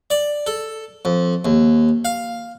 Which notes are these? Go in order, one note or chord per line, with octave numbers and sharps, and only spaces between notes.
D5
A4
F2
D#2
F5